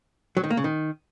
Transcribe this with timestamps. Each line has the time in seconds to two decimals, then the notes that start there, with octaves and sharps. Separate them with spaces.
0.37 F#3
0.44 D#3
0.50 A#3
0.57 C#3
0.64 D#3